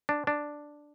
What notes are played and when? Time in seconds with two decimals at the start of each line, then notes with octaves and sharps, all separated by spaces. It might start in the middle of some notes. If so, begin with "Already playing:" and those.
0.09 D4
0.27 D4